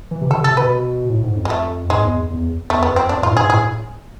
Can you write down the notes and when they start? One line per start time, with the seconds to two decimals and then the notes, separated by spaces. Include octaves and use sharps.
0.11 E3
0.21 C3
0.30 D3 A4
0.40 C3
0.44 A4
0.51 C3
0.57 B4
0.60 B2
1.10 A2
1.24 G#2
1.37 F2
1.45 G#3
1.50 A3
1.90 G#2 G#3
2.04 E2
2.30 E2
2.70 E2 A3
2.83 B3
2.90 F2
2.96 C4
3.09 F2 D4
3.22 G#2 F4
3.31 A2
3.37 G#2 G#4
3.50 A2 G#4